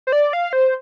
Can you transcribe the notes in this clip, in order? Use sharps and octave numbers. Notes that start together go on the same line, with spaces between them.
C5
D5
F5
C5